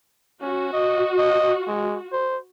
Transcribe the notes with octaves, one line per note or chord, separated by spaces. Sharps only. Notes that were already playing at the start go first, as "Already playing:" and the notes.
C#4 F#4
D#5
D#5
G#3
C5